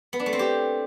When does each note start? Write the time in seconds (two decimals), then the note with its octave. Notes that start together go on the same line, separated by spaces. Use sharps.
0.13 B3
0.19 D4
0.26 A3
0.33 C4
0.39 G4